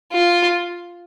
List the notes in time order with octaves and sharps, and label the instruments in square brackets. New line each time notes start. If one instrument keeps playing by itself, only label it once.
[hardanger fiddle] F4